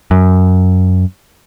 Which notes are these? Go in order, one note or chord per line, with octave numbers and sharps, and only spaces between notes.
F#2